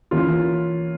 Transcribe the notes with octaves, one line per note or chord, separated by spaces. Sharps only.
E3 A#3 C#4 F4